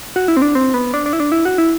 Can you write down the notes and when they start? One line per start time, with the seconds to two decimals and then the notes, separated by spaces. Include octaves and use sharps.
0.16 F#4
0.28 E4
0.37 C4
0.42 D4
0.55 C4
0.74 B3
0.94 D4
1.06 D4
1.13 E4
1.20 D4
1.32 E4
1.45 F#4
1.58 E4